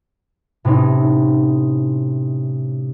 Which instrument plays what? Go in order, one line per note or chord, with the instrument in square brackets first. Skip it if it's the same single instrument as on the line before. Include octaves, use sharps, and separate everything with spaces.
[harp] A2 C3 C#4 D#4